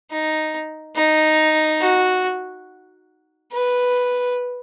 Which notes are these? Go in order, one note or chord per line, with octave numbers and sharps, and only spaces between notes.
D#4
D#4
F#4
B4